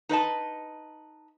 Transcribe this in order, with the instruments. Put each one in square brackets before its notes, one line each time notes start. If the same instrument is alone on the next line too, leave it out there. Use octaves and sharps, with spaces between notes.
[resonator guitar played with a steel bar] D#4 B4 D#5 A5